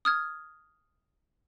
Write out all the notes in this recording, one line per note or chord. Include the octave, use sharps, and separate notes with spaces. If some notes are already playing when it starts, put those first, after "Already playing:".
D#6 F6 G#6